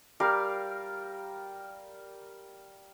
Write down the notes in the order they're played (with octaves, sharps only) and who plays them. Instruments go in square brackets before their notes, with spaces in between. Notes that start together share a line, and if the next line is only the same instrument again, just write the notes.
[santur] G3 G4 A#4 F5